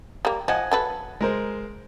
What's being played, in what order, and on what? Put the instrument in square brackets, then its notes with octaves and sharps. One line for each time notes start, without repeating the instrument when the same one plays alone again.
[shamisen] G3 A#3
[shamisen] F3 [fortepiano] D#5 F#5 G#5
[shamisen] F#3 A4 B4
[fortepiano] G#3 A#4 C5